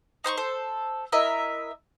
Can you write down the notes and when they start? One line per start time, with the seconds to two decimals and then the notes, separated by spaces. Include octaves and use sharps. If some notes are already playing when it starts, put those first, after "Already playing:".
0.24 D#4 C5 C6 C#6
0.37 A4 C5
1.12 E4 A#4 D#5 E5